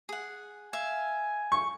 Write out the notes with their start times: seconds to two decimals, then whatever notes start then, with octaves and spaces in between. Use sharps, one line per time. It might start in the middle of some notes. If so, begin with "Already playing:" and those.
0.09 G#4 F#5
0.73 E5 F5 G#5
1.52 C#6